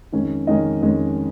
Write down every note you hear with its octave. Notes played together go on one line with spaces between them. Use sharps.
F2 D#3 G#3 C#4
F2 D#3 G#3 C#4 D#5
F2 D#3 G#3 C#4